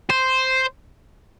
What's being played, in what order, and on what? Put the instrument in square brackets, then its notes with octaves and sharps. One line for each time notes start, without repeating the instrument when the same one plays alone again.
[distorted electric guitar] C5